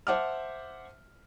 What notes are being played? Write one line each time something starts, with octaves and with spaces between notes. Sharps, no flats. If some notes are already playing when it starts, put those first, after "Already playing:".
C5 E5 F#5 A5 D6 F6